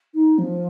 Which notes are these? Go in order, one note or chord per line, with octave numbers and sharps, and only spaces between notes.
D#4
F3